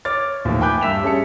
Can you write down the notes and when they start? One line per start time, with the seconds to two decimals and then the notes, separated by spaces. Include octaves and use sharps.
0.05 C#5 D6 F6 A6
0.45 D#2 A2 E3 F3
0.61 G5 G#5 B5 D6 F#6 G6
0.81 G2 E5 E6 B6 E7 F7
1.02 G3 C#4 G#4 A5 C#7